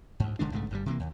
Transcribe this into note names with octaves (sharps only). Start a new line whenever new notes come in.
D2 G#2
F1 D3 G#3 D4
B1 G#2 C#3 A3
G1 G2 C3 G3
C3 E3 A#3
D#2